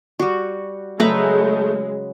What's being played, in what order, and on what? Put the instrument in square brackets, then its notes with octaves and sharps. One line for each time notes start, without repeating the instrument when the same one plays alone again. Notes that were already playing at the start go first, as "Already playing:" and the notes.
[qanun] G3 F#4
[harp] C#3 F#3 [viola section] G#3 [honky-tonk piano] A3 [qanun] B4 E5 A#5